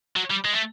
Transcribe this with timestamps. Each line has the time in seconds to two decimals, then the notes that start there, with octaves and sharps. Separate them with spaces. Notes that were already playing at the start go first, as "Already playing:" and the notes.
0.16 F#3
0.30 G3
0.45 G#3
0.53 A3